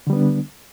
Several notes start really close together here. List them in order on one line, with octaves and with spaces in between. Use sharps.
D3 G3 B3 D4